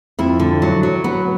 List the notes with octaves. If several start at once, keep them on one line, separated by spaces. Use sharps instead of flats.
F2 E4
D3
F#3
F#3
B3